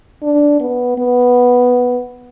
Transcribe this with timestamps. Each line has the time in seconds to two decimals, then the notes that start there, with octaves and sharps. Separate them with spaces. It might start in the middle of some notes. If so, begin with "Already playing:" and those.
0.23 D4
0.60 B3
0.98 B3